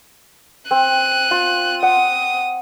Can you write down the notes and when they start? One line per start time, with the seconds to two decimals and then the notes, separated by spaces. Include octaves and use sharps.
0.71 C4 F#6 D#7
1.31 F4
1.83 F#5 D#6